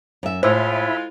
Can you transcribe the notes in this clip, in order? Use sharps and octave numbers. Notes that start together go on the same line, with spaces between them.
F#2 E5
A2 G#3 F4 C5 E5 B5 E6